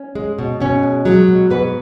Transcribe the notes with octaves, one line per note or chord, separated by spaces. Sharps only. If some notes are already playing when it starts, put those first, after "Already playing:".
Already playing: C#4
G#3
B2
B2 C#4
G#3
F#3 G#3 F#4
B2
G#2 B3 B4